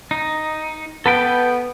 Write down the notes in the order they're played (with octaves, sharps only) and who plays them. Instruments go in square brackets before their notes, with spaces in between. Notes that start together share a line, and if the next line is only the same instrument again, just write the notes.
[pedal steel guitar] D#4
[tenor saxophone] B3 [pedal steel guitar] A4 B4 G5